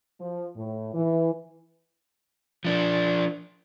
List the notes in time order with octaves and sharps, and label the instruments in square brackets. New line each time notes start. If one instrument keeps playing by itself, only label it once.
[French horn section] F3
A2
E3
[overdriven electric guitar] F3 D4